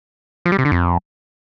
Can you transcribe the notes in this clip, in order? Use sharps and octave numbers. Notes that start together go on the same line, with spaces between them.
F3
G3
C3
D3
F2